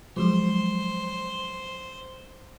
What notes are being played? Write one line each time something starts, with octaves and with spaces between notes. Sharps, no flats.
F3 F#3 G#3 C5